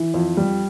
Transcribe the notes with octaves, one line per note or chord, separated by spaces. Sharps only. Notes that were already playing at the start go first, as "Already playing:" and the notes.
Already playing: E3
F2
G3